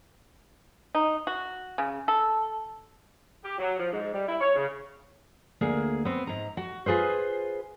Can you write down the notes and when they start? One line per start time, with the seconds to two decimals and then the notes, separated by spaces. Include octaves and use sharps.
0.95 D#4
1.27 F#4
1.78 C#3
2.08 A4
3.43 G4
3.58 F#3
3.78 F3
3.91 G#2
4.12 G3
4.27 E4
4.40 C#5
4.55 C#3
5.61 D2 A#3 G#4
6.05 B3 C4
6.27 G#2 A#5
6.57 F#4
6.86 F4 G#4 B4 C5